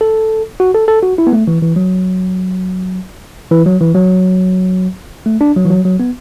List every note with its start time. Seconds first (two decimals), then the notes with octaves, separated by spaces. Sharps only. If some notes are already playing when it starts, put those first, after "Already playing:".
0.01 A4
0.60 F#4
0.74 A4
0.88 A4
1.03 F#4
1.18 E4
1.27 B3
1.33 A3
1.48 E3
1.62 E3
1.76 F#3
3.52 E3
3.66 F#3
3.81 E3
3.95 F#3
5.26 A3
5.41 D4
5.56 F#3
5.65 E3
5.70 F#3
5.85 F#3
6.00 B3